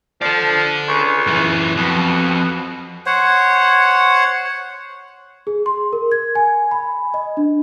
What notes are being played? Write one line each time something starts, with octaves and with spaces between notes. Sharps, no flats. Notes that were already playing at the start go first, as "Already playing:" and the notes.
F3 A4 D5
C#2
F#2 E3
F2 B2
C5 C#5 F#5
G#4
C6
A#4
G#6
G#5
B5
D#5
D4